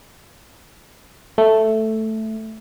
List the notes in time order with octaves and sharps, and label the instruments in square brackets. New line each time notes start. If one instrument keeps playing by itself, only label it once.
[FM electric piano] A3